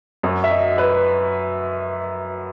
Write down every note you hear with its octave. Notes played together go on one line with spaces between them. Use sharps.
F#2 F#3
E5
D#5
B4